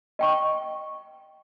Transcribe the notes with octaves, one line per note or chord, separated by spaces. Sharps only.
D#5 G5 C#6